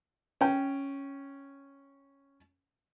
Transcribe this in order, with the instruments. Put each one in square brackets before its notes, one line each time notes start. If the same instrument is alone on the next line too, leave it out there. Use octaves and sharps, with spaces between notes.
[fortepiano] C#4 G5